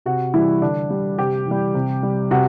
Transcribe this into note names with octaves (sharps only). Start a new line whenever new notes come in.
C3 F#4
E3 G3 E4
D3 D4
G3
C3 G4
E3 G3
C3
G3
C3 F#4